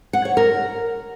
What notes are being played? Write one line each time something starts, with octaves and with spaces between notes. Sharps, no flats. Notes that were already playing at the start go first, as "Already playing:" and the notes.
F#5
C#5
A#4